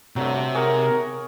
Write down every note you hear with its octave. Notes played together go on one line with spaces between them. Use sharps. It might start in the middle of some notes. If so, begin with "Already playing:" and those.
G2 C3 F#3 A3
G#2 G4 G#4 A#4 C#5 F#5